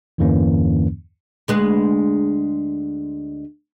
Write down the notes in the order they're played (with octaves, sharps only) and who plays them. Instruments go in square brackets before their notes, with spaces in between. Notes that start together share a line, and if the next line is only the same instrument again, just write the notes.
[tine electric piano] E2 G2 D3 E3 A#3 C#4
[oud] D2 G#3 B4